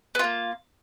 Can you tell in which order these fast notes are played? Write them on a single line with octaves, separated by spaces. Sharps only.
B3 F4 A#3